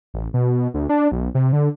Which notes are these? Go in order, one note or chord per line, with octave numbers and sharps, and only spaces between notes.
A1
B2
D2
D4
B1
C3
D3